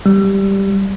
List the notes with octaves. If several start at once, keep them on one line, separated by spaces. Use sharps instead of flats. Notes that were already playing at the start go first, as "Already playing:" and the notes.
G3